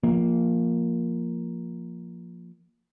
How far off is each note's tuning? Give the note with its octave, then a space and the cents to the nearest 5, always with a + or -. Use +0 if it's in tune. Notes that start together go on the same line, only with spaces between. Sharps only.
F3 +0 A#3 +0